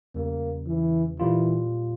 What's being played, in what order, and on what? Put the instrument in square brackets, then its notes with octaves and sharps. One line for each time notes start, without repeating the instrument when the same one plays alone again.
[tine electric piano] E2 C#3 G3 [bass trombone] A#3
[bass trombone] E3
[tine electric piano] A#2 G3 A#3 F4 [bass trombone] E3